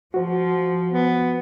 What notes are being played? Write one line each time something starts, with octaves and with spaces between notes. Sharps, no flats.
F3 F#4 C5
B3